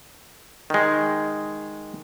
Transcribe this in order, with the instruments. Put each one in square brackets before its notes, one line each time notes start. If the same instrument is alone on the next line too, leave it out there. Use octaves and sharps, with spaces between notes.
[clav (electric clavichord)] D#3 G#3